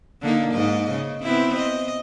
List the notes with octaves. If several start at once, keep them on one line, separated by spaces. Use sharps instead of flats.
D3 A#3 D#4
G#2 D#5
C#3
B3 C4 E4
D#5